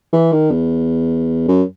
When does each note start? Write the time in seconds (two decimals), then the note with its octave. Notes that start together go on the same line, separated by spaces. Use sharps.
0.13 E3
0.32 D#3
0.51 E2
1.48 F#2